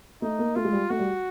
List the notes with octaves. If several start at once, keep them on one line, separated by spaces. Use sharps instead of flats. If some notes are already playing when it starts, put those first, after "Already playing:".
A3 D#4
A#3
A3 F4
G#3
G3
A3 F#4
G3